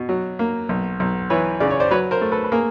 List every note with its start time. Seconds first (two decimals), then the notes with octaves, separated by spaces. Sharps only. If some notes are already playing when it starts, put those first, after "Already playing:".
Already playing: B2
0.09 F#3
0.39 A#3
0.69 B1
1.00 B1
1.30 E3 B4 C#5
1.60 C#3 D5
1.70 C#5
1.80 C5 D5
1.91 F#3 B4 C#5
2.11 A#4 C5
2.21 A3
2.32 A4 B4
2.44 B4
2.52 A#3 G#4 A#4